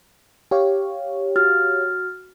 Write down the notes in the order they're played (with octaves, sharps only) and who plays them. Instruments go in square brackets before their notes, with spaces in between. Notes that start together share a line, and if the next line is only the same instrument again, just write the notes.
[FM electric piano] G4 C#5 F5
[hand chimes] F#4 F6 A6